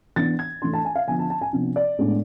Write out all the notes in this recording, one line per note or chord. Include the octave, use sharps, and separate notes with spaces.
E3 B3 D4 A6
G#6
E3 A3 D4 C6
A5
G#5
F5
D3 F3 B3 D4 G#5
A5
A5
G#5
C3 F3 B3 D4
D5
A2 G#3 B3 D4